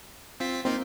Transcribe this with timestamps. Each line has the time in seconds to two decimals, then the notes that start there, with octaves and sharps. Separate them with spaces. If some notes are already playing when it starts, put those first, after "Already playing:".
0.40 C4 F4 B6
0.65 A#3 C4 D#4 F4